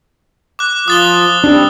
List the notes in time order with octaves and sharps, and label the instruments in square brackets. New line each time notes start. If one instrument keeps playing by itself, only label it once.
[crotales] D6 F#6
[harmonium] F3 F4 [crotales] D#6 A6 G7
[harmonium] G3 C4 [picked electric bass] D4